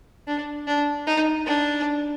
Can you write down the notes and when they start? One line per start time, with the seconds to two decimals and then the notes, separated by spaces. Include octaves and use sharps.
0.27 D4
0.67 D4
1.07 D#4
1.46 D4